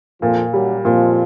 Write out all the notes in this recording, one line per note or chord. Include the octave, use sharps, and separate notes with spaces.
F2 A#2 F3
F#2 F#3 G3
F2 A#2 F3